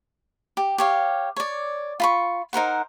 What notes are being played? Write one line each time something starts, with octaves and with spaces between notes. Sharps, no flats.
G4
G4 C#5 F5
C#5 D5
F4 B5 C#6
D#4 A#4 C5 F#5